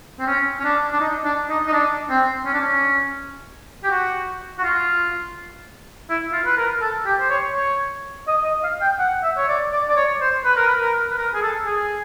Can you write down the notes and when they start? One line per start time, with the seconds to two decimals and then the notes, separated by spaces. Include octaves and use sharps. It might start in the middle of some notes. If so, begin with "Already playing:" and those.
0.19 C4
0.27 C#4
0.60 C#4
0.64 D4
0.92 D4
1.00 D#4
1.24 D4
1.49 D#4
1.68 D#4
1.73 D4
2.10 C4
2.45 C#4
2.53 D4
2.60 C#4
3.84 G4
3.90 F#4
4.58 F#4
4.63 F4
6.09 E4
6.32 F4
6.45 B4
6.57 A#4
6.81 A4
7.06 G4
7.20 C5
7.30 C#5
7.54 C#5
8.27 D#5
8.44 D#5
8.64 F5
8.81 G5
8.99 F#5
9.23 E5
9.37 C#5
9.48 D5
9.72 D5
9.88 D5
9.97 C#5
10.21 C5
10.45 B4
10.57 A#4
10.67 B4
10.81 A#4
11.11 B4
11.18 A#4
11.34 G#4
11.42 A4
11.65 G#4